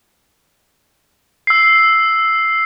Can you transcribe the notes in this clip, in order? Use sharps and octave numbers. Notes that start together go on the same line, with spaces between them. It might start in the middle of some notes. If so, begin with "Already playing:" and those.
E6 C7